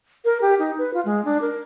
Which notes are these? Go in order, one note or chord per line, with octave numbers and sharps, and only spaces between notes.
A#4
G4
D#4
B4
F4
G#3
D4
A#4